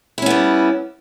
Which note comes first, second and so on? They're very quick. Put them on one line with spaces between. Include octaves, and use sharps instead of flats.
E4 C#4 B3 G3